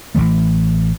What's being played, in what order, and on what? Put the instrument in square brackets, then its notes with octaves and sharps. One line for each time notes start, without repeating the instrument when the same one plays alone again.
[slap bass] A1 D#3 E3 A3